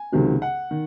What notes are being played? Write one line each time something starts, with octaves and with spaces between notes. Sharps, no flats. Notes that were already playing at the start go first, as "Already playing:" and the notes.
Already playing: G#5
C#2 C3 D#3 F#3
F#5
D#3